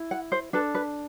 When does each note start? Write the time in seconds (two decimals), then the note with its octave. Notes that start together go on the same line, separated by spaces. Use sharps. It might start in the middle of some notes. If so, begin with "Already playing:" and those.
Already playing: E4
0.11 F#5
0.32 C5
0.53 D4 A4 B4
0.75 B4